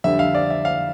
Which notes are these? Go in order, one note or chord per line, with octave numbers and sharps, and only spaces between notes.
F2 D3 G3 E5
F5
D5
E5
F5